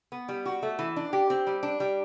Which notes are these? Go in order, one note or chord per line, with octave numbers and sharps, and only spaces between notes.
B3
G3
F#4
A3
E3
D4
G4
C4
G3
D4
G3